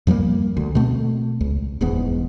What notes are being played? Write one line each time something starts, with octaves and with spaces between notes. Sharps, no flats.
F2 F3 G3 A#3
D2
B2 A3 C4
C#2
D#1 E2 G#2 B3